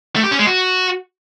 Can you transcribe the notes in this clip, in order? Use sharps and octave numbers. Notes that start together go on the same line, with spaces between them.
A3
G4
C#4
G#3
F#4